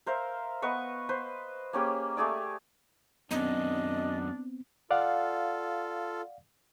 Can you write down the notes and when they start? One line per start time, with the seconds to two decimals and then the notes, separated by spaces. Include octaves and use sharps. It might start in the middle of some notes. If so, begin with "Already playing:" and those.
0.06 A#4 C5 E5 F5
0.62 B3 B4 D#5 C#6
1.09 B4 C5
1.73 A#3 C#4 G4 G#4
2.17 A3 G4 G#4 D5
3.31 F#2 D#3 B3 C4 D4 D#5
4.91 F4 A4 D5 F5 F#5